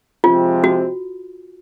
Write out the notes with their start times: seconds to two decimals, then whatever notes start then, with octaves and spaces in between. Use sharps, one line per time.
0.24 C3 F3 G#3 C4 F4
0.64 F#4